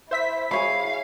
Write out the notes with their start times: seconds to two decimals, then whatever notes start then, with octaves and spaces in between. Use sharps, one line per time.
0.11 E4 C5 E5 B6
0.51 G#4 C#5 F5 B5